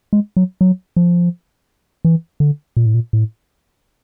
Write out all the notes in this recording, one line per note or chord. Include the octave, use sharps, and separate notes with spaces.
G#3
F#3
F#3
F3
E3
D3
A#2
A2
A#2
A2